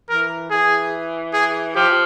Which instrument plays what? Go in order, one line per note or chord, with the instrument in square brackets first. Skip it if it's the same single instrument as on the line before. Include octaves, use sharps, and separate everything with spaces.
[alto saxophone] E3 [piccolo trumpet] A#4
[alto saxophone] E3 [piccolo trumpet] G#4
[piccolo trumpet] G#4
[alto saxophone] F3 [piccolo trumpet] G4